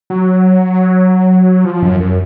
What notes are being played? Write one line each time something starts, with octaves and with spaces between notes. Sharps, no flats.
F#3
F3
F#2
F#2